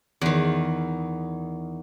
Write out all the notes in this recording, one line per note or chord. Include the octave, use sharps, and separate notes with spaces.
E2 D#3